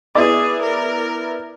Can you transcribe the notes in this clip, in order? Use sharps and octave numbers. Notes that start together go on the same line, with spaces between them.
B3 E4 G#4 D5
A#4